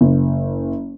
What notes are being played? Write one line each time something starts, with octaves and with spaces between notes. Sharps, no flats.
F#1